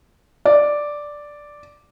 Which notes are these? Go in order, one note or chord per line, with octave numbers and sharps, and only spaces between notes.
D5